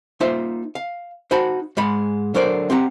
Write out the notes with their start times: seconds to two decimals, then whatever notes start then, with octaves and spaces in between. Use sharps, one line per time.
0.20 A#3 D#4 F4 C5 E5
0.75 F5
1.31 D#4 F#4 C5 A5 B5
1.77 G#2 G#3 B5
2.34 D3 F#3 A#4 C5 D5
2.70 C4 G4 F#5 A#5